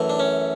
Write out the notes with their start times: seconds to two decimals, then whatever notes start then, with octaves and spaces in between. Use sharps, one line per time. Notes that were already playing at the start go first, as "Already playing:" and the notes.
Already playing: F#2 E3 A3
0.10 D4
0.19 C#4